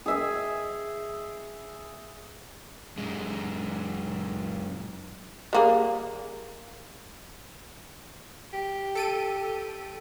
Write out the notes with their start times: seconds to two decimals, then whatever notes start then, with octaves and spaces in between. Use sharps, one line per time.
0.06 G#4 E5 G#5
2.97 F#2 G#3
5.53 G3 A#3 G#4
8.54 G4
8.95 A4 D7 D#7